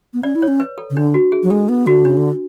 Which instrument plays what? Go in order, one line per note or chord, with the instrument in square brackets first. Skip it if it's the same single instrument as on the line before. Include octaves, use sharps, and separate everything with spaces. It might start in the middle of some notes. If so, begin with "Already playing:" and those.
[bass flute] B3
[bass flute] C#4 [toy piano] D5
[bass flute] E4
[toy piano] C#5
[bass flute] C#4
[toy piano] B4
A4
[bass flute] C#3
[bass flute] D3 [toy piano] D4
[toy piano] F#4
G#4
[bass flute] F#3
[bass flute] G#3 [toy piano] A4
[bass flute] B3
[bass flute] D3 [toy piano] F#4
[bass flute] C#3 [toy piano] D4
[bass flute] D3